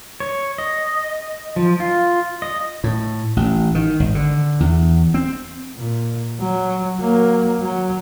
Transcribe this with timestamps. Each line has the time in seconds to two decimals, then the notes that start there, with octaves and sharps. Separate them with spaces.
0.20 C#5
0.58 D#5
1.56 F3
1.80 F4
2.42 D#5
2.84 A2
3.37 A1
3.75 D#3
4.00 G#1
4.15 D3
4.60 E2
5.14 C4
5.76 A#2
6.40 F#3
6.99 F#3 A#3
7.61 F#3